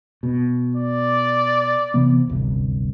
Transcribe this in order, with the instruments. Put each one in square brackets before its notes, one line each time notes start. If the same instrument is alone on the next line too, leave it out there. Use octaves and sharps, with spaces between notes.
[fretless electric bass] B2
[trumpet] D5
[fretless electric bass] C3 E3 B3
D1 G1 C2